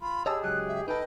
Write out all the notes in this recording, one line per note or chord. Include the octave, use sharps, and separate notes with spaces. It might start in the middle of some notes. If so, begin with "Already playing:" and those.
F4 B5
G4 G#4 C#5 D#5 A5 E6
C#2 F#3 D#5 F#6
E5
D#4 A4 B4 D#5 G5